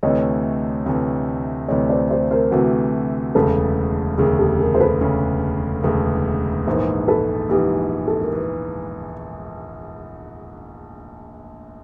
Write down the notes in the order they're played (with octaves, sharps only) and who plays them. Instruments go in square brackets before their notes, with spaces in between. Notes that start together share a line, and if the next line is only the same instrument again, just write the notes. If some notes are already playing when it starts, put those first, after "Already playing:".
[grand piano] D2 C3 E3 A3 [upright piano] C#5 D#5
[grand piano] D2 C3 E3 A3
[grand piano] D2 C3 E3 A3 [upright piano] C#5 D#5
[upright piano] C5 D5
C5 D5
A#4 C5
[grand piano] D2 C3 E3 A3 [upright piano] F#4
[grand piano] E1 D2 C#3 [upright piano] A4 B4
[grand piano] E1 D2 C#3 [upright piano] G#4 A#4
[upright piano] G4 A4
G#4 A#4
C5
A4 B4
[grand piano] E1 D2 C#3
[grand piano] E1 D2 C#3 [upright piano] A4 B4
[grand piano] A#1 G#2 E3 [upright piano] A#4 C5
[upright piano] A4 B4
[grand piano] A#1 G#2 E3 [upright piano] G4
[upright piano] A4
A#4
[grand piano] E3